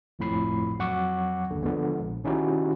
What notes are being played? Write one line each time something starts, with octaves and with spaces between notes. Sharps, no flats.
G1 F2 A2 F3 B5 C7
F2 F#3 F#5 C#6 D6
G1 D#2 D3
D3 F3 G#3 B3
A#1
D#3 C#4 D#4 E4 F#4 G4